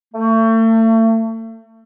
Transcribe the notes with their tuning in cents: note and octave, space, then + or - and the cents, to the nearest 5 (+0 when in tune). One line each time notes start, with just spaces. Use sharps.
A3 +35